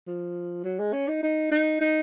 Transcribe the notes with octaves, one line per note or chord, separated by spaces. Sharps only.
F3
F#3
G#3
C#4
D#4
D#4
D#4
D#4